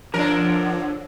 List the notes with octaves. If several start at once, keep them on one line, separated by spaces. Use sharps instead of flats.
D3 F3 D4 A#4 C#5